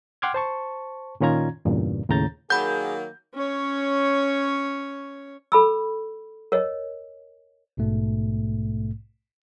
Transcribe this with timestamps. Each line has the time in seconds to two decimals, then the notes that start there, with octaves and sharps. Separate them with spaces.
0.22 F#5 G5 C6 D6 F6 G#6
0.34 C5 A5 C#6
1.20 A#2 D#3 C#4 F4 A#5 G#6
1.65 E2 G2 A#2 C#3
2.09 D#2 A2 C#3 A#5 G6 A6
2.50 D#3 F#3 A#3 G#4 F#5 B5 G6
3.34 C#4 C#5
5.52 A4 B5 E6
6.52 A#4 C#5 D#5
7.77 A#1 G#2 B2 A3